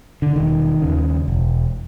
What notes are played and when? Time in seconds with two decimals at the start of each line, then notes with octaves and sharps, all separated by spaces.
0.22 D3
0.35 E1 D#3
0.82 D#2 C#3
1.28 E1